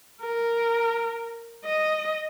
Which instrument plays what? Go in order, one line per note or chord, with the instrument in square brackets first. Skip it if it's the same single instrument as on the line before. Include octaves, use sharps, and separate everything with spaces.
[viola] A#4
D#5